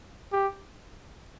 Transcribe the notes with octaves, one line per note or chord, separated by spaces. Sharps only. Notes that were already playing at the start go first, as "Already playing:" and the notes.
G4